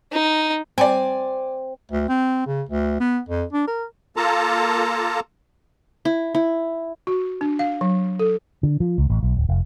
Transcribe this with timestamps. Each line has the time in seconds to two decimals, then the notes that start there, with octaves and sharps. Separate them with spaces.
0.12 D#4
0.78 C4 D5 G#5
1.91 D2
2.09 C4
2.47 C#3
2.69 D2
3.00 B3
3.29 F2
3.53 D4
3.67 A#4
4.17 A#3 F4 A4 A5 A#5
6.05 E4
6.34 E4
7.07 F#4
7.41 D4
7.59 F5
7.81 F#3
8.19 A4
8.63 D3
8.80 F3
8.98 C#2
9.10 A1
9.23 B1
9.36 D1
9.49 F1